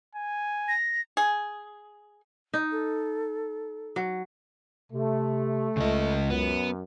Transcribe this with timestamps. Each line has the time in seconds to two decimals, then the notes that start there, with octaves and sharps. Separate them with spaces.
0.15 G#5
0.68 A#6
1.17 G#4
2.54 D#4
2.71 A4
3.96 F#3
4.92 C3 A3
5.77 C#2 C#3 D#5
6.30 F#2 B3